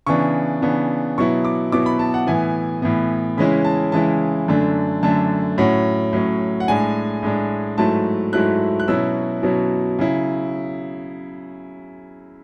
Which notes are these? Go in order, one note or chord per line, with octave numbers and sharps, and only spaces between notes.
C#3 E3 B3 D4 C#6
C#3 E3 B3 D4
B2 F#3 B3 E4 C#6
D6
B2 F#3 B3 E4 D6
B5
A5
F#5
A2 E3 B3 G#5
A2 E3 B3
C#3 E3 G#3 C#4 E4 B5
A5
C#3 E3 G#3 C#4 E4 A5
F#2 D3 A3 D4
F#2 D3 A3 D4 A5
A2 F#3 C#4 F#5
A2 F#3 C#4
F#5
A2 G#3 D4 G#5
A2 G#3 D4
G#2 F#3 A3 E4 A5
G#2 F#3 A3 E4 F#6
F#6
B2 F#3 C#4 E4 E6
B2 F#3 C#4 E4
C#3 F#3 E4